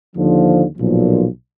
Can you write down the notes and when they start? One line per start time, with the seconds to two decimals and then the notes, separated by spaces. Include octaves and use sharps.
0.15 D#2 D3 F3
0.77 B1 A#2 F3